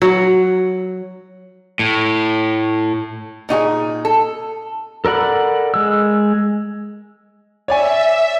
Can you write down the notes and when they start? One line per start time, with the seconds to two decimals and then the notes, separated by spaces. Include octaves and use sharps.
0.02 F#3
1.79 A2
3.49 A#2 D#4 F#4 G#4
4.05 A4
5.05 A4 A#4 D5 F#5 B5
5.74 G#3 E6
7.68 C#5 D5 E5 G#5